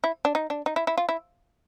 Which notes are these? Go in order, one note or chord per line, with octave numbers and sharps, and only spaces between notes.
E4
D4
D#4
D4
D#4
E4
E4
F4
E4